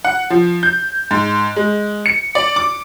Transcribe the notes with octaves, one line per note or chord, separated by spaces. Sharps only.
F#5
F3
G6
G#2
G#3
C#7
D5
D6